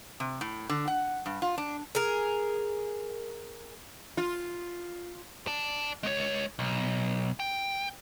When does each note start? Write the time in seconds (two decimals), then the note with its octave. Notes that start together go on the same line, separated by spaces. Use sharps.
0.20 C3
0.41 A2
0.69 D3
0.88 F#5
1.26 G2
1.42 F4
1.58 D4
1.95 G#4 A#4
4.17 F4
5.47 D5 A5
6.03 G#3 C#5
6.59 B1
7.40 G5